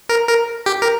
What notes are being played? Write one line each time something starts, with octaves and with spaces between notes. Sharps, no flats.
A#4
A#4
G4
A#4